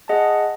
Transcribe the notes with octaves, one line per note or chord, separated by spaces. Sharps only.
G#4 D#5 F#5 A5